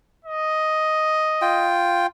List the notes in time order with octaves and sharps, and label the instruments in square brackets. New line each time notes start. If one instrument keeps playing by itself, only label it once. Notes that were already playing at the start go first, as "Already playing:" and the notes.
[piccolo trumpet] D#5
[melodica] F4 G5